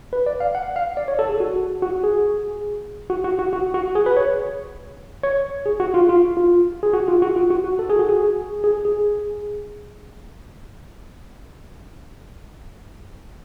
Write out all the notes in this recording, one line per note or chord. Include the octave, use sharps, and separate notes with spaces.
B4
D5
F5
F#5
F5
D5
C#5
A4
G#4
F#4
F#4
G#4
F#4
F#4
F#4
F#4
F#4
G#4
B4
C#5
C#5
G#4
F#4
F4
F4
F4
G#4
F#4
F4
F#4
F4
F#4
F#4
A4
G#4
F#4
G#4
G#4
G#4